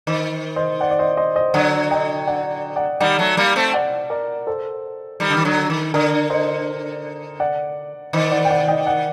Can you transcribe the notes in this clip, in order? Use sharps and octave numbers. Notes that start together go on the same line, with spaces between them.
D#3 C5 D#5
C5 D#5
D5 F#5
D5
C5 D#5
C5 D#5
C5 D#5
D3 F#3 D5 F#5
D#5 G5
D5 F#5
D5 F#5
D#3 G3 D5 F#5
F#3 A3
G3 A#3
A3 C4
D5 F#5
A#4 D5
A4 C5
D#3 G3
D3
D#3
D3 F#3
D#3
D3 A#4 D5
C5 D#5
D5 F#5
D#3 C5 D#5
D5 F#5
G5
D5 F#5
D#5 G5
D5 F#5